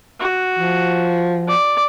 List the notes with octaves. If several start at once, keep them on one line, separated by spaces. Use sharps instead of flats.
F#4
F3
D5